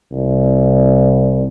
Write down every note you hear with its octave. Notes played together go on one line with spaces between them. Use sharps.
C2